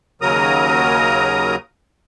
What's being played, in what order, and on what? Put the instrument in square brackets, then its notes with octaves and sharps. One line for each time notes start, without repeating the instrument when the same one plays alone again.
[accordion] D#2 C#3 F#3 A#4 A#5 D#6